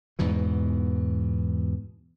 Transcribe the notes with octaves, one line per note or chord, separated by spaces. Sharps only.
E2 G#2 B2 E3